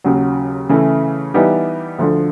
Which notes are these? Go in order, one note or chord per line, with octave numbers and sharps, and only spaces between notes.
D#2 C#3 F#3
C#3 E3 A3
E3 G3 B3 D#4 G4
D2 D3 F3